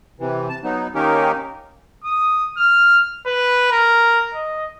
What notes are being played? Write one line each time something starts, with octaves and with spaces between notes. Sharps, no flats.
C3 E3
A5
F#3 B3 D#4
D#3 A#3 C#4 D#4 G4 A#4
D#6
F6
B4
A#4
D#5